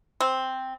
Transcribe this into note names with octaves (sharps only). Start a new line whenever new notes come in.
C4